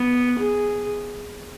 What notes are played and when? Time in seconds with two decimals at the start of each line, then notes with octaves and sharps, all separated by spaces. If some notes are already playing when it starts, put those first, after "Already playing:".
Already playing: B3
0.39 G#4